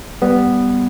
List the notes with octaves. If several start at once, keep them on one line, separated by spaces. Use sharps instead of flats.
G3 B3